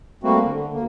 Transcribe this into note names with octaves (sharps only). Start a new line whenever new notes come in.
G3 A3 A#3 C4 F#4
D3
D2 A#3